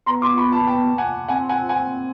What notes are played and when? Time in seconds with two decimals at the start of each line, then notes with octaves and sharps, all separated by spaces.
0.06 B3 A#5 C6
0.22 C6 D6
0.37 B5 C#6
0.52 A5 B5
0.67 G5 A5
0.98 F#5 G#5
1.28 C4 F#5 G#5
1.49 F#5 G#5
1.69 F#5 G#5